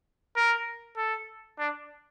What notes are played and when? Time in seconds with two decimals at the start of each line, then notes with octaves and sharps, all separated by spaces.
0.37 A#4
0.97 A4
1.59 D4